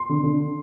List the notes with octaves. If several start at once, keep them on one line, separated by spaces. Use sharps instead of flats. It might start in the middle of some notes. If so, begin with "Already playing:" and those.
Already playing: C6
D3
D3